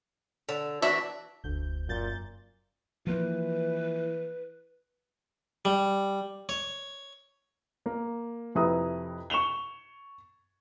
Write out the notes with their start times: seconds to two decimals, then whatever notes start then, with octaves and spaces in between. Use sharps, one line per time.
0.49 D3
0.82 E3 D4 F#4 E5
1.44 F1 D2 G6
1.89 F#2 A#2 G6 A6
3.07 E3 F3 A#3 B4
5.65 G3
6.49 C#5
7.86 A#3
8.55 F2 C3 E4 B4 A#5 D#6
9.30 C#6 E7 F7 G7